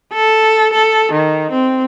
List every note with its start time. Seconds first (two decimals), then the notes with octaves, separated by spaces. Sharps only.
0.13 A4
0.73 A4
1.12 D#3
1.52 C4